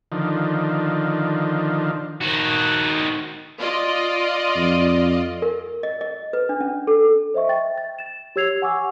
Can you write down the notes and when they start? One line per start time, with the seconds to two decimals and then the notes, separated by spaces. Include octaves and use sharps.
0.12 D3 D#3 F3
2.21 D#3 F#4
3.59 F4 D5 D#5
4.56 F2
5.42 A#4
5.83 D#5
6.01 D#5
6.33 B4
6.49 D4
6.60 C#4
6.87 A4
7.34 C5 D#5 E5 C#6
7.48 E5 G5 A6
7.78 A6
7.99 A6 E7
8.36 G4 C#5 E6 G#6 C7 F7
8.62 F#5 G#5 C#6 D6 E6